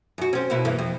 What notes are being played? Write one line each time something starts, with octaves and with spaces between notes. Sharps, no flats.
F#2 F#4
C4 C#4
B2 A#3 E4
G2 E3 A#3
F2